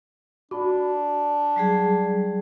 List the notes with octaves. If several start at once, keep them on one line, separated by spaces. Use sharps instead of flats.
D4 F#4 B5
F#3 G3 G#4